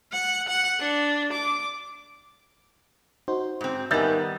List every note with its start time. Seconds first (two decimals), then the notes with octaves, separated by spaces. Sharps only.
0.12 F#5
0.48 F#5
0.80 D4
1.32 D6
3.28 D#4 F#4 C5
3.61 G#2 C4
3.91 D#3 G3 B3 E5 G#5 E6 G6 A6